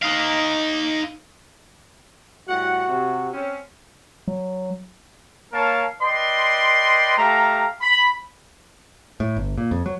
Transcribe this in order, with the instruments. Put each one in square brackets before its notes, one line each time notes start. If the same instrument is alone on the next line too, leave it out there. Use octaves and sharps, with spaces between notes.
[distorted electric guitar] D#4 F5
[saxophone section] A2 G3 F#5 [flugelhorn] F#4
[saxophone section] C3
C4 C#4
[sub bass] F#3
[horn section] A#3 A#4 C#5 F5 A5
B4 D5 D#5 G5 C6
A3 G4 A4 F5 A#5
B5
[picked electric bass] A2
G1
A#2
F2
F#3